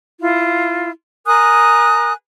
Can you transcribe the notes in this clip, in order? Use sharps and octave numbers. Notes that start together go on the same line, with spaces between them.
E4 F4
A#4 G#5 D#6 F#6